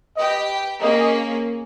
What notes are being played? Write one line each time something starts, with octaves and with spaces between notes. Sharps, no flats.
G4 B4 D#5 G5
A#3 C#4 G#4 D#5